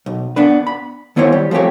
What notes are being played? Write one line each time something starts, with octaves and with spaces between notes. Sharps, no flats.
B1
B3 D4 B4
B5
D#3 B3 E4 C5 C#5
G3
F3 A3 C4 G4 C#5